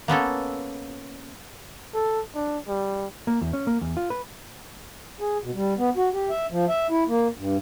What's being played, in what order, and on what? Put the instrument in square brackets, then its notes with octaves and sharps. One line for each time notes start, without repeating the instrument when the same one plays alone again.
[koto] A#3 B3 C#4 A4
[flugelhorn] A4
D4
G3
[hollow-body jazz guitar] A#3
E2
C#4
A#3
E2
F4
B4
[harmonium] G#4
B2
G3
B3
F#4
G4
E5
F3
E5
E4
A#3
G2